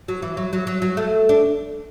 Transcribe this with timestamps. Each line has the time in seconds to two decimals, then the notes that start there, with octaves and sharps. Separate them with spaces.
0.08 F#3
0.22 E3
0.37 F#3
0.53 F#3
0.67 F#3
0.82 F#3
0.97 A3
1.29 D4